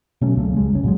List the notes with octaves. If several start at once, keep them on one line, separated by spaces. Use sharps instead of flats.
B2 F#3 A3 C#4
C#2 C#3 F#3 A3
C#2 G3 G#3
F#1 C#2 C#4
A#2 F#3 G#3